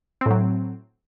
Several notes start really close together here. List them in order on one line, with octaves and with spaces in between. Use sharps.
C4 A2 F#3